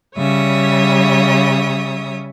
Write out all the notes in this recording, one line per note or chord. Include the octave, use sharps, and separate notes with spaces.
C#3 G3 C#5 E5 D#6